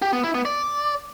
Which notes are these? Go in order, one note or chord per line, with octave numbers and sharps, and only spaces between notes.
G4
B3
E4
B3
D5